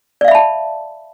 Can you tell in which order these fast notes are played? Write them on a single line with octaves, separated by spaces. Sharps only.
D5 F5 E5 B5 A5